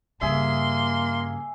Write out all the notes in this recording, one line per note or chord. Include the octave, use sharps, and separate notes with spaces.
G2 C#3 A#3 G#4 E5 C6